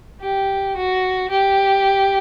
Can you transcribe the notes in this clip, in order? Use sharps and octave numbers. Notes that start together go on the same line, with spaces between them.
G4
F#4
G4